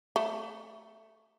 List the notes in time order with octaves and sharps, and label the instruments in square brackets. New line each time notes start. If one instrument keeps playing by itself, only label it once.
[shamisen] A3